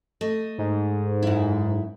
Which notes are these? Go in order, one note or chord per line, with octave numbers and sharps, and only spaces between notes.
A3 D#5
G#2
F#2 E4